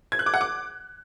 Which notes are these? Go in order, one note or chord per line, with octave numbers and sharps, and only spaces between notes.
G#6
F#6
D6
F#5
D6